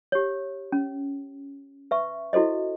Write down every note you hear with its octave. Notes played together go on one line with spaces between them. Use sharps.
G4 C#5
C#4
B4 E5 C#6
E4 F#4 A4 C5 D#5